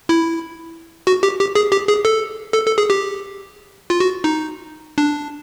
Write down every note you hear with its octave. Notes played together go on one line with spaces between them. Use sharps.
E4
F#4
G4
G4
G#4
G4
G#4
A4
A4
A4
G#4
G4
F4
F#4
D#4
D4